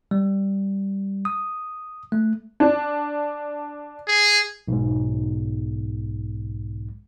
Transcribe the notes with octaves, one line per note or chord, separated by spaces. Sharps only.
G3
D#6
A3
D4
G#4
B1 G#2